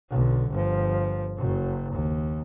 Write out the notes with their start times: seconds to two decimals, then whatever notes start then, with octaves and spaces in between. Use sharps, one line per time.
0.11 B1 D3
0.51 G1 F3
1.38 F#1 F#2
1.93 D#2